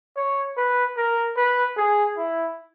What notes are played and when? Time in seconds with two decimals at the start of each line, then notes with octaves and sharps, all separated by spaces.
0.16 C#5
0.57 B4
0.97 A#4
1.37 B4
1.77 G#4
2.17 E4